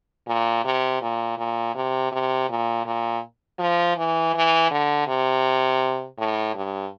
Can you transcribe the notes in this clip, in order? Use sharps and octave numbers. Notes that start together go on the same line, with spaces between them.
A#2
C3
A#2
A#2
C3
C3
A#2
A#2
F3
E3
E3
D3
C3
A2
G2